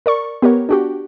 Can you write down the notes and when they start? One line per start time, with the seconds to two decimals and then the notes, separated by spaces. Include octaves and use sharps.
0.06 A#4 D5 C#6
0.42 B3 G4 A#4 C#5
0.69 D4 F#4 G4